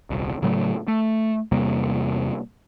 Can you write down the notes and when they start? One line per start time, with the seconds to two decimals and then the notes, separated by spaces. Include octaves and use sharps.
0.10 D#1 C2
0.42 A2 C#3 F#3 A3
0.88 A3
1.52 E2 C3 G3 A#3